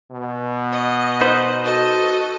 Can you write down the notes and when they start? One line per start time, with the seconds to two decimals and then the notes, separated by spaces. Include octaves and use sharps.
0.11 B2
0.72 D#5
1.21 D#4 B4 C5
1.63 F#4 A4 D#5